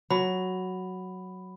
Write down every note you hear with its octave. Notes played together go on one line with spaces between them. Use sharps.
F#3 B5